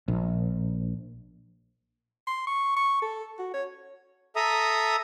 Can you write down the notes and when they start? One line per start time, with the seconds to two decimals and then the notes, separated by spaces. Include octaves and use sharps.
0.08 A#1
2.27 C6
2.47 C#6
2.76 C#6
3.02 A4
3.39 F#4
3.54 C#5
4.36 A4 E5 A#5 D#6